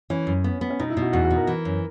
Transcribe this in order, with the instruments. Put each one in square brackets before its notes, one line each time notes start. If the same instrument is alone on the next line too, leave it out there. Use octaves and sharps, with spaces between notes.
[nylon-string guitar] E3 [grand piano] C#4
[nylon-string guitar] F#2
B3
B3
[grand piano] C#4
[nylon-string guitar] B2 [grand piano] D#4
[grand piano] E4
[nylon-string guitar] B2
[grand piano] F#4
[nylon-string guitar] E2 [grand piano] F#4
[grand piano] F#4
[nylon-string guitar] B2
[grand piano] A#4
[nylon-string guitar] E3
F#2